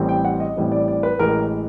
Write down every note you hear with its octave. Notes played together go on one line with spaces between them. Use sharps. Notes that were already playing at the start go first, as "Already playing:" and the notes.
Already playing: A1 A2 E3 G3 C4
G5
F#5
D#5
A1 A2 E3 G3 C4
D5
D5
B4
A1 A2 E3 G#3 A#4